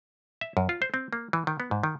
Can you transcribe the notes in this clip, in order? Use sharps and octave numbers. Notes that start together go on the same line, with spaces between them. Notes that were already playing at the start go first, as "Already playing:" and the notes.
E5
F#2
F4
C5
C4
A#3
E3
D#3
B3
G#2
D#3